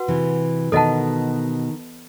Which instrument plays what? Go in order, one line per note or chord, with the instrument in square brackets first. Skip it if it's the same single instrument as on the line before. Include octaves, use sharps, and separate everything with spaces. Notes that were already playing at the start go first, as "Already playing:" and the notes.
Already playing: [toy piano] F#4 B4 F#5
[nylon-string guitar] C3 E3
[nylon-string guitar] B2 D#3 [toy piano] A4 D#5 F#5 A5